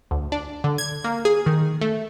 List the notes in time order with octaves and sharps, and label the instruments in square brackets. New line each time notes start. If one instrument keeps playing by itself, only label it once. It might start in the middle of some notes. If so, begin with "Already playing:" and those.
[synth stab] D2
D4
D3
G#6
A#3
G#4
D#3
A3